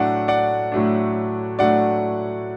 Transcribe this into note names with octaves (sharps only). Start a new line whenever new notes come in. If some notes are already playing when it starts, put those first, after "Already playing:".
Already playing: A2 F#3 A3 D4 D5 F#5
D5 F#5
A2 F#3 A3 D4
A2 F#3 A3 D4 D5 F#5